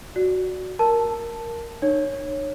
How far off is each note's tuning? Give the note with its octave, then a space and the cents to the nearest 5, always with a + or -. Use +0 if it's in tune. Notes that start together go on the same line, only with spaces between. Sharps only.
F#4 +0 D5 +0
A#4 +0 A5 +0
D#4 -45 C#5 -5